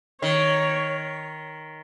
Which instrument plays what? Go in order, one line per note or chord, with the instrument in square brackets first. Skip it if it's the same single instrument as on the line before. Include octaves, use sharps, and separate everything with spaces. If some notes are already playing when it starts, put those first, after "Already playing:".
[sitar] D#3 [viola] C#5